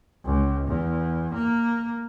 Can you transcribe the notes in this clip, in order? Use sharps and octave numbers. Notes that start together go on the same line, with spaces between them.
C#2
E2
A#3